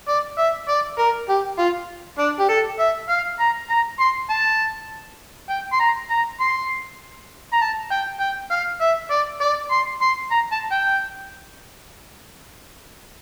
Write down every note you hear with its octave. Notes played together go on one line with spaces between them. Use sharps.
D5
E5
D5
A#4
G4
F4
D4
G4
A4
E5
F5
A#5
A#5
C6
A5
G5
C6
A#5
A#5
C6
A#5
A5
G5
G5
F5
E5
D5
D5
C6
C6
A#5
A5
G5